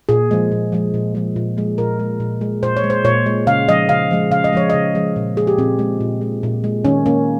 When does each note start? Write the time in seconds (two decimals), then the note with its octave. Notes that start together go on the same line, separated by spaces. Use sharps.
0.09 A#2 G#4
0.31 F3 G#3
0.52 A#2
0.72 F3 G#3
0.94 A#2
1.15 F3 G#3
1.36 A#2
1.57 F3 G#3
1.78 A#2 A#4
2.00 G#3
2.20 A#2
2.41 G#3
2.62 A#2 C5
2.77 C#5
2.84 G#3
2.90 C5
3.05 A#2 C#5
3.26 G#3
3.47 C#3 F5
3.68 F3 G#3 D#5
3.89 C#3 F5
4.11 F3 G#3
4.31 C#3 F5
4.44 D#5
4.53 F3 G#3 C#5
4.70 C#3 D#5
4.95 F3 G#3
5.16 A#2
5.37 G#3 G#4
5.47 G4
5.58 A#2 C4
5.79 G#3
6.00 A#2
6.21 G#3
6.43 A#2
6.64 G#3
6.85 D#3 C#4
7.06 A#3 C#4